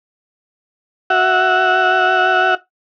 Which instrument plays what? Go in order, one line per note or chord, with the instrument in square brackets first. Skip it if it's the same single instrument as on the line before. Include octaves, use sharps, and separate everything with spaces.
[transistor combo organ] F#4 E5 F#5